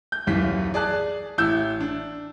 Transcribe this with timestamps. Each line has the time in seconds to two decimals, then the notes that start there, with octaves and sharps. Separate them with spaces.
0.12 G6
0.27 D#1 B1 F#2 E3 B6
0.74 G#4 D5 A5 F#6
1.38 A1 E4 E6 G6
1.80 D4